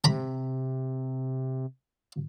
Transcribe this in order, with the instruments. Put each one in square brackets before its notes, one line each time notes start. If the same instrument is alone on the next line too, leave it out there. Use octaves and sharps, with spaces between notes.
[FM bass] C3 [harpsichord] A#5 B5